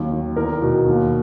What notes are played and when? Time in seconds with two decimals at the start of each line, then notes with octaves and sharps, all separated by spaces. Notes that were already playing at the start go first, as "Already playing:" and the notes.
Already playing: D#2 F#3
0.11 D#3
0.36 E2 A#4
0.62 B2
0.86 D#2